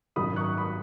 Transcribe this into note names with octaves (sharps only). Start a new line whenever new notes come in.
G#1 F#2 D#3 B5 D#6
C#6 F#6
B5 D#6